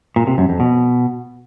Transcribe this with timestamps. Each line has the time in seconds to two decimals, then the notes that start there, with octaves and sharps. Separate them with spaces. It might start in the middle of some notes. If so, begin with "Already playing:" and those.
0.16 A#2
0.27 C3
0.38 F#2
0.49 F2
0.60 B2